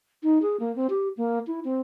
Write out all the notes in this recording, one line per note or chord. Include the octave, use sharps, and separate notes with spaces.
D#4
G#4
A#3
C4
G4
A#3
E4
C4